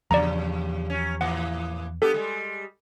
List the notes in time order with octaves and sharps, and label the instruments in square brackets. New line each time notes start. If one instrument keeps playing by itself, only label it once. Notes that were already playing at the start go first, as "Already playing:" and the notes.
[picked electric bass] E2 F3 [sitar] G2 A#2 C#3 [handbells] D5 A#5
[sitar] F#3 C#4
[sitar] A2 E3 A#3 [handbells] F#5
[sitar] G2 B3 G4 [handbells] A4
[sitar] G3 G#3